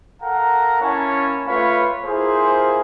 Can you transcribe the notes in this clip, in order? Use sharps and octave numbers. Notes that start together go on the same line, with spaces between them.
A4 A#4 F5 F#5 A#5
A#3 C#4 E4 C#5 G#5 A5
A3 F4 B4 C#5 F5 B5
A#3 E4 F4 G#4 C5